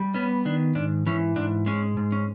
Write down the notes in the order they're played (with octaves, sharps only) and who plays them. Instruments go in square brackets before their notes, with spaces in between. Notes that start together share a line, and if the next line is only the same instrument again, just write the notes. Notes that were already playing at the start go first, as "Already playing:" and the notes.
Already playing: [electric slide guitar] G3
B3 C#4
D#3 D4
G#2 D4
E3 C#4
G#2 D4
G#3 C#4
G#2
C#4